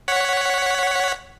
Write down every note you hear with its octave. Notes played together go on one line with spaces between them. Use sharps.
C#5 F#5 B6